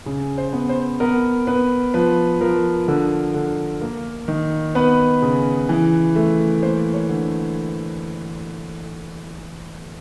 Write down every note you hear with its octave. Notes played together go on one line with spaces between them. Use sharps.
C#3
C5
B3
C5
B3 A#4
B3 B4
F3 B4
F3 A#4
D3
D3
A#3
D#3
B3 B4
C#3
E3
A3
A#3 C5
C#5
D3